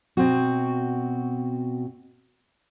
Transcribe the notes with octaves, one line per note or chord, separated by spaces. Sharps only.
B2 C4 F#4